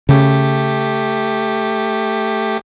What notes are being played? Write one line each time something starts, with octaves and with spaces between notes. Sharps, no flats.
C#3 A3 G4